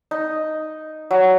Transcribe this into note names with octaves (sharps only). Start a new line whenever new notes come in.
D#4
F#3